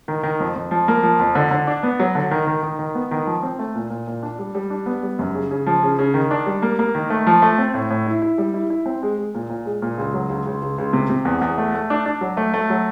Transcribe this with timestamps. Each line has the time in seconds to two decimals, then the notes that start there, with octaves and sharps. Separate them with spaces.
0.08 D#3
0.23 D#3
0.40 F2
0.55 F2
0.71 F3
0.88 A#3
1.03 F3
1.20 F2
1.35 D3
1.51 D3
1.67 D4
1.83 B3
2.00 F#3
2.15 D3
2.31 D#3
2.47 D#3
2.63 D#3
2.79 D#3
2.95 B3
3.11 D#3
3.27 F3
3.43 C4
3.59 A3
3.75 A#2
3.90 A#2
4.07 A#2
4.23 D4
4.39 G3
4.55 G3
4.70 D4
4.86 B3
5.03 G3
5.19 F#2
5.35 C#3
5.51 C#3
5.66 F3
5.83 C#3
5.99 C#3
6.14 D#3
6.31 D4
6.46 G3
6.62 A#3
6.79 A#3
6.95 D#3
7.10 A3
7.27 F3
7.42 A3
7.58 C4
7.74 A2
7.90 A2
8.06 E4
8.22 E4
8.38 G3
8.54 E4
8.70 E4
8.86 C4
9.02 G#3
9.18 G#3
9.34 A#2
9.49 A#2
9.66 G#3
9.82 A#2
9.98 C#2
10.14 F#3
10.29 C#2
10.46 C#2
10.62 C#2
10.78 C#2
10.93 C3
11.10 C3
11.25 E2
11.41 E2
11.58 A3
11.74 A3
11.90 D4
12.06 D4
12.21 F#3
12.37 A3
12.54 A3
12.70 F#3